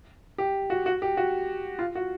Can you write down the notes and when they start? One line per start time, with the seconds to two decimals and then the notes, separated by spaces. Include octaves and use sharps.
0.38 G4
0.70 F#4
0.86 F#4
1.02 G4
1.17 F#4
1.79 F4
1.95 F#4